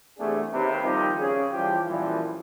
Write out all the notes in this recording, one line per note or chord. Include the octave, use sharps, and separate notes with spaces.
E2 C3 A3 B3 D4 G#4
D#2 C3 B4
D#3 F3 G3 C4 D#4 G4
C#3 G#4
E3 F3 G3 G4
F#2 A#2 E3 F3 G3